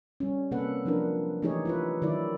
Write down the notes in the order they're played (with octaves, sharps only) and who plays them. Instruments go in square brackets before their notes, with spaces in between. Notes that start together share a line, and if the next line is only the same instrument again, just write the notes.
[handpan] G3 C#4
C3 A#3 A4 B4 F#5
F3 F#3 D4 E4 A#4 B4
E3 A3 D#4 G4 G#4 C#5
E4 F4 B4
D#3 F#3 D#4 E4 D5